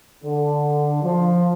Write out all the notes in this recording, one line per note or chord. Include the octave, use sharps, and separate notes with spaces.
D3
F3